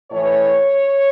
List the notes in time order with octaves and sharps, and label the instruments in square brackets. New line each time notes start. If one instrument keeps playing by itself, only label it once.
[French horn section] A2 E3 C#5